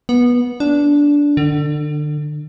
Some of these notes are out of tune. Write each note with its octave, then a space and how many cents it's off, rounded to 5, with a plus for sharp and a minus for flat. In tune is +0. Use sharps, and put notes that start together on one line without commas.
B3 -20
D4 -15
D3 +30